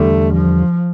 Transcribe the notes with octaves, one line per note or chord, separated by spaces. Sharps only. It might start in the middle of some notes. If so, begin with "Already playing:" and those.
Already playing: E2 D3 G3 A3
F3